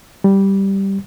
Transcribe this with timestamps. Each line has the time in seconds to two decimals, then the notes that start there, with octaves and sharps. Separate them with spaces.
0.24 G3